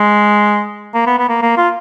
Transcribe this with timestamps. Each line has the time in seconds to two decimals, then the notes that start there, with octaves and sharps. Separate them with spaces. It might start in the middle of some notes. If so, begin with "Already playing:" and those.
Already playing: G#3
0.94 A#3
1.06 B3
1.18 B3
1.29 A#3
1.42 A#3
1.57 F4